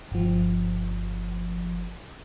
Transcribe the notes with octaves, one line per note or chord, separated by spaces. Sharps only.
G1 F3